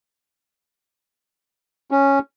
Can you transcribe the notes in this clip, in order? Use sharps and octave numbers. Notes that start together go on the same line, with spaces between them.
C#4